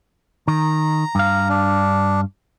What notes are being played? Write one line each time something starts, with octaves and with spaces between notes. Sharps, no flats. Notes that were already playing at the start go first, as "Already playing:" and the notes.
D#3 A#5
G2 F5
D4